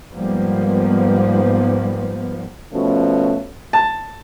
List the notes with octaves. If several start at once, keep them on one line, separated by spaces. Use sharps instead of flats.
G#2 F3 G3 A#3 B3
B2 F3 A3 C#4
A5